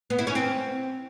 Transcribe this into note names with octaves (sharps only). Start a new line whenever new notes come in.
B3
E4
C#4
C4